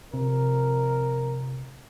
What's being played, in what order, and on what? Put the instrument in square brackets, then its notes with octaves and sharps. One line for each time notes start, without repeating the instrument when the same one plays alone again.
[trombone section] F2 A#4 [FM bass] C3